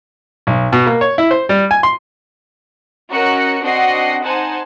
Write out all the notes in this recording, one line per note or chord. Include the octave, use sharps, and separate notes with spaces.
B1
B2
A#3
C#5
E4
C5
G3
G#5
C6
C#4 F#4 A#4 D#5 F#6 C#7
C4 D4 F#4 D#5 F#5 C7
D#4 C5 F#5 G#5 A5